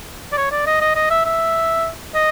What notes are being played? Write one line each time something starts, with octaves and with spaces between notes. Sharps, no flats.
D5
C#5
D5
D#5
D#5
D#5
E5
E5
D#5